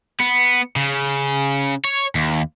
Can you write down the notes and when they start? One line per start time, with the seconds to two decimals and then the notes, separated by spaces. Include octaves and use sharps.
0.20 B3
0.76 C#3
1.85 C#5
2.15 D#2